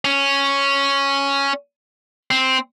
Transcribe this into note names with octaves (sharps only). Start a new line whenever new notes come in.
C#4
C4